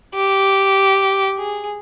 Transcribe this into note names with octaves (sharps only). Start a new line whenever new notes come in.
G4
G#4